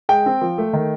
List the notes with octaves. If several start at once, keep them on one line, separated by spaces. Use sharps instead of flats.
G#3 G5
C4
F3
A3
D#3